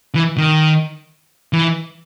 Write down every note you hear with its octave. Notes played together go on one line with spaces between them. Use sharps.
E3
D#3
E3